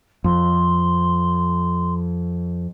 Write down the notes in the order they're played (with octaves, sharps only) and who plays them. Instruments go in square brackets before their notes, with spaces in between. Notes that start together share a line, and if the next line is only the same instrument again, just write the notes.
[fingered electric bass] F2 [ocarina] C6